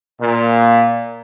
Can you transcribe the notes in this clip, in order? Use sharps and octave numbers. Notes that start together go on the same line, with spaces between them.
A#2